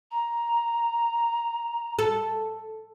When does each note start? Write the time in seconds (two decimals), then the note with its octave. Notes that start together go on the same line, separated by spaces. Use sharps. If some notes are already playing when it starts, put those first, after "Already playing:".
0.10 A#5
1.99 A4